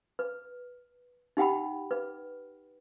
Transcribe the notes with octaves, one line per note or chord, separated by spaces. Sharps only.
B4
D#4 G4 F#5 G5 B5
B4